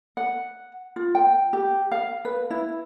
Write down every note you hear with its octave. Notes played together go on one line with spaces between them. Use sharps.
F#5
F4
G5
G4
F5
B4
E4